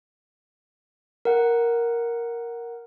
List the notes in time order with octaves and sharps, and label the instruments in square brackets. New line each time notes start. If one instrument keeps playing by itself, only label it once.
[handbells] A#4 F#5